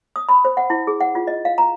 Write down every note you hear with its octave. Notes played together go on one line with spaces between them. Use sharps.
D#6
B5
C5
F#5
E4
G#4
F#5
F4
D#5
F5
A#5